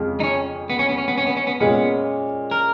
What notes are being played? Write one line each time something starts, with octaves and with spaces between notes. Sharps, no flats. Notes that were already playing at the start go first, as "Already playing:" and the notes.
Already playing: F2 C#3 F3 G#3
D#4
C#4
B3
C#4
B3
C#4
B3
C#4
B3
C#4
B3
A#2 G#3 B3 C#4
A#4